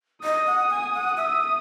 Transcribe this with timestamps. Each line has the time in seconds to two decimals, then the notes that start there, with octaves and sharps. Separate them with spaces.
0.23 D#5 D#6
0.47 F#5
0.70 G#5
0.94 F#5
1.17 E5